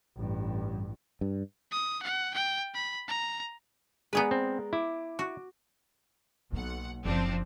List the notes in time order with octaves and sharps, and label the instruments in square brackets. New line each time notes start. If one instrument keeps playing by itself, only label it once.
[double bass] A1 G2
[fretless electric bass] G2
[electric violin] D#6
F#5
G5
B5
A#5
[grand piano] G#3 D5 A#5 [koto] B3 G#4 B4
[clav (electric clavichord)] C4
[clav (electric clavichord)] E4 [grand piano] D6
[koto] F#4
[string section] B1 F#5 [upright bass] A#3
[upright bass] F#1 [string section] F3 C4 D4